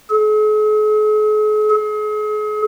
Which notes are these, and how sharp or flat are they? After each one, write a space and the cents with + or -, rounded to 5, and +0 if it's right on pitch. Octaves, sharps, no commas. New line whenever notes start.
G#4 +45
G#4 +40